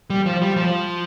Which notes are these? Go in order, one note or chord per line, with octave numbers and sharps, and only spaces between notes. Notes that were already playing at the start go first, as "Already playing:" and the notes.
G3
F3
G3
F3